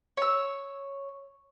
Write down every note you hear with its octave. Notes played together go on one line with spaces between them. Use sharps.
C#5 E6